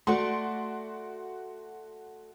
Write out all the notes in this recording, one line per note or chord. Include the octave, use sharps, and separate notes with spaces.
A3 F#4 D5 F#5 C6